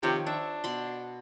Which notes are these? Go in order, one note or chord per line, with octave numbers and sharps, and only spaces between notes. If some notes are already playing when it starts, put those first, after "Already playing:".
C3 D#3 F3 C#5
D4 E5
B2 B5 C6